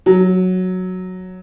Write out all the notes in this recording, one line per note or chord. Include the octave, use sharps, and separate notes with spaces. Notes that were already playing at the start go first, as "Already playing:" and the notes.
F#3